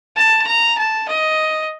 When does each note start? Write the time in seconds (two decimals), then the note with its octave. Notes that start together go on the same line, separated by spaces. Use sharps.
0.17 A5
0.48 A#5
0.78 A5
1.09 D#5